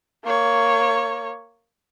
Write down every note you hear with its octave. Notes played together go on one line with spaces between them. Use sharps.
A#3 C#5